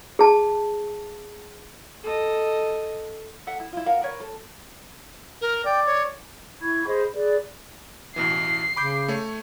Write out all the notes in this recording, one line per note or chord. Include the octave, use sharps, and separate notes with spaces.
G#4 A5
A4 D#5
A4 E5 F#5
E4
E4 F4
A#4 F5 F#5
A#4 B4 C#5
A4
A#4
D5 G5
C#5
E4 B5 C#6 G#6
G#4 C5 D#5 B5
G#4 B4 D5
A1 B2 E3 C7
C#3 B5 D6 G6
A3 C#5